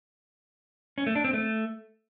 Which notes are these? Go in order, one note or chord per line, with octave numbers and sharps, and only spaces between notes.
C#4
A3
D4
C4
A3